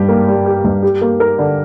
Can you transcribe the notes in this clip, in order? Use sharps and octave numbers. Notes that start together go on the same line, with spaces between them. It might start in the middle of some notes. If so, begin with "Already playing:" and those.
Already playing: G2 G3 G4
A#3
G3
G4
G2
G4
A#3
A#4
D3